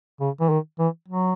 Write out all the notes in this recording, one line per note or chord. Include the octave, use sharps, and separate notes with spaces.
C#3
E3
D#3
E3
F#3